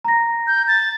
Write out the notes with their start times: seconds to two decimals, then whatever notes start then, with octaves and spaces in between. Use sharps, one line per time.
0.05 A#5 A#6
0.47 G6
0.68 A6